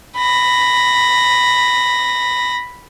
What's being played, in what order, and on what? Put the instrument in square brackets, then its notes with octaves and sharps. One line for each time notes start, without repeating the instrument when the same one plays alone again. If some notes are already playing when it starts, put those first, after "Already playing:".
[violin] B5 A#6